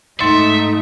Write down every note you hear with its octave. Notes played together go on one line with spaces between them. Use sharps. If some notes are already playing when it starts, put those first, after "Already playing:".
G#2 A3 D#4 E5 C6 A6 C#7